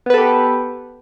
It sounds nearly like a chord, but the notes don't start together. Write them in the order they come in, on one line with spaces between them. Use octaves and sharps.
B3 B4 A4 G4